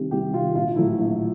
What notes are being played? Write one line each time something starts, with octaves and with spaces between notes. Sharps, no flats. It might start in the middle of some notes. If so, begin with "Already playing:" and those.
Already playing: C2 C3 D#3 G3
C2 G4
C3 D#3 G3 F4
A#1 F4
A2 F#3 A3 E4
A#1